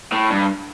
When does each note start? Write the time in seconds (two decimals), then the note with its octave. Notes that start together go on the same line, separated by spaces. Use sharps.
0.12 A2
0.30 G2